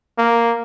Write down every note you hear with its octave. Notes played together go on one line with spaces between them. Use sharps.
A#3